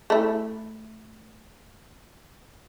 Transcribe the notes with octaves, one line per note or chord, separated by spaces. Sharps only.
A3 E4